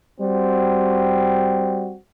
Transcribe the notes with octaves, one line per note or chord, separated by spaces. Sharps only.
G3 C4 F#4